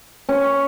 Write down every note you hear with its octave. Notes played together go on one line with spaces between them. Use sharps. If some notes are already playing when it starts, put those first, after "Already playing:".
C#4